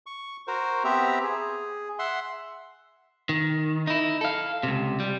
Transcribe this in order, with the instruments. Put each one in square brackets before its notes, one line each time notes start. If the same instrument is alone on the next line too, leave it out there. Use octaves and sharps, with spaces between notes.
[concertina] C#6
F#4 A#4 C5
B3 C4 G4 E5 A#5
G#4
E5 F#5 C6
[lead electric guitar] D#3
D#4 E4
A4 F5
C#2 C3
G3